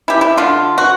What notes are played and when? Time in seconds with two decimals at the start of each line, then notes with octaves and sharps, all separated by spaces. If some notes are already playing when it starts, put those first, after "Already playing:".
0.08 E4 G4
0.21 E4
0.37 D3 F4
0.78 F#4